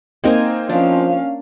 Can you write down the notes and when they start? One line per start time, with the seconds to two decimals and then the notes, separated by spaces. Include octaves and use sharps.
0.24 A#3 C4 D#4 A#4 G#5
0.69 F3 C#4 D4 F5